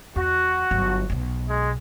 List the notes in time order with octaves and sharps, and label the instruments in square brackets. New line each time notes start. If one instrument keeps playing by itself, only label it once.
[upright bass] E2 [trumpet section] F#4
[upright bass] G1 F#3
B1 B2
[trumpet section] G#3